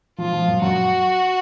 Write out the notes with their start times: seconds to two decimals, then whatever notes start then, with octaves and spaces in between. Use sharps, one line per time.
0.18 F3 F4
0.33 F3
0.48 F#2
0.62 F#2 F#4